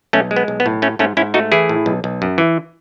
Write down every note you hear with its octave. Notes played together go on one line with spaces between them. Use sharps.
B1 A3 C#4
G#3
B3
B1
B3
A2
A3 C#4
G#2 A3 C#4
G#2 C#4 E4
A3 D#4 F#4
E3 E4 G#4
A2
B1
B1
F#2
E3